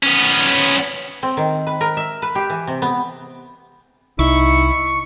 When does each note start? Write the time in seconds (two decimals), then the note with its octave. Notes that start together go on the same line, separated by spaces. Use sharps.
0.03 B3 C#4
1.23 C4
1.37 D#3
1.67 B4
1.81 A#4
1.97 E5
2.22 B4
2.35 G4
2.50 E3
2.67 C3
2.82 B3
4.19 C2 D#4 E4 C#6